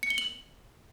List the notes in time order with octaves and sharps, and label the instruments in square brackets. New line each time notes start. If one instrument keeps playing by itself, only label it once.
[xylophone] C#7
G7
F#7